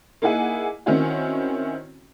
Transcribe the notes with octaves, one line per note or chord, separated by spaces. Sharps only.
A#3 D#4 E4 G#4 F#5 G#5
D#3 C4 C#4 E4 F#4